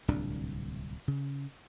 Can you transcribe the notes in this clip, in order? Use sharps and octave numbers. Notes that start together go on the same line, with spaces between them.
D1 C2 A#2 D4
C#3